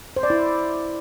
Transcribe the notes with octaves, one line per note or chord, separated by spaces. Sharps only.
C5
D5
E4